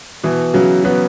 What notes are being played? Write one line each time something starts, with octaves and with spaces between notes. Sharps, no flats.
B2 E3
C#3 F#3
F#3 B3